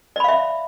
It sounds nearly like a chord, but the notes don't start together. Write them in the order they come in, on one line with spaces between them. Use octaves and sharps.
D5 B5 F5 E5